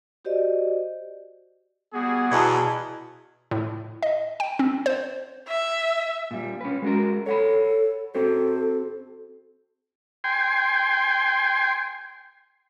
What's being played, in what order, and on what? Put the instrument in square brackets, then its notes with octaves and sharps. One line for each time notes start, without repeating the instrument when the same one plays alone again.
[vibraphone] F#4 G4 C5 D5 D#5
[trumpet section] G3 F#4 G#4 [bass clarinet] B3
[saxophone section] E2 [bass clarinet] B2 [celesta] A5 A#5 G#6
[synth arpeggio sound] A2
D#5
G5
C4
C5
[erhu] E5
[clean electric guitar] A#2 G3
C#4 B4
G#3 F#4 A#4
[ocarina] A4 [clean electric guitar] C#5 F#5 B5
[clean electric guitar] C4 F#4 C5 [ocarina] A4
[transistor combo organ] G5 G#5 C6